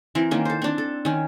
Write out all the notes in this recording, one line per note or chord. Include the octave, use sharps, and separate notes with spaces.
E3 C4 A#4
D#3 A#3 C#4
A4 C5
C4 D4
A4
D#3 C#4